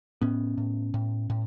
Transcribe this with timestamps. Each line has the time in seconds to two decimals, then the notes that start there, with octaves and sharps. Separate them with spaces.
0.22 A2 B3 C#4
0.58 A2
0.94 A2
1.30 A2